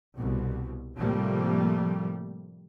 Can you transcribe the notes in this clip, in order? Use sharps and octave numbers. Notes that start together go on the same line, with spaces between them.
C2 B2
A2 C3 F3 G3 A3 A#3